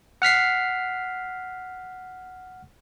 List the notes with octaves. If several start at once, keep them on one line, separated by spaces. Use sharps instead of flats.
F#5 F6 B6 C7